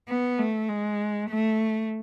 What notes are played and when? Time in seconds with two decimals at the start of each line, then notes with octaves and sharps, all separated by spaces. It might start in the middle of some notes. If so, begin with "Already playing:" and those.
0.08 B3
0.39 A3
0.69 G#3
1.30 A3